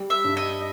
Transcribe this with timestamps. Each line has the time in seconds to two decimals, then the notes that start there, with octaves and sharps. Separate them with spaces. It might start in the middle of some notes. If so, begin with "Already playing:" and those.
Already playing: G3
0.10 E5
0.24 G2
0.37 D#5